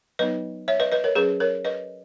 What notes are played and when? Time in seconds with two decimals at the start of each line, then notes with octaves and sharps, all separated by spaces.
0.19 F#3 B3 D#4 B4 D#5
0.68 C#5 E5
0.80 B4 D#5
0.92 B4 D#5
1.04 A#4 C#5
1.15 F#3 C#4 G#4 B4
1.40 A#4 C#5
1.65 B4 D#5